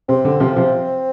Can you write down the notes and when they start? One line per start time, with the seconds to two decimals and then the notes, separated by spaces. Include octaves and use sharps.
0.08 C3 C4
0.25 D3
0.40 C3 F3
0.56 C3 F3